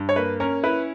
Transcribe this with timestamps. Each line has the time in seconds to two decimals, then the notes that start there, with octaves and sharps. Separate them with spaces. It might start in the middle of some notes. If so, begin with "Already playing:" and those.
Already playing: G2
0.09 C#5
0.16 A#3 B4
0.40 C#4 A#4
0.64 E4 B4